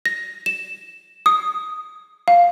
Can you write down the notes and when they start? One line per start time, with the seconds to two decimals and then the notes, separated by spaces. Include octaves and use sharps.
0.06 A#6
0.46 E7
1.26 D#6
2.28 F5